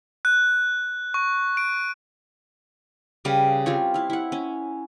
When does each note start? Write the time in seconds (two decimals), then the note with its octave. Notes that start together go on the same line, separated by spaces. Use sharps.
0.25 F#6
1.14 C#6
1.57 D7
3.25 C#3 G3 B4 F5
3.66 G3 C4 F4 C#5
3.94 E4 F5
4.10 E4 F#5
4.32 C#4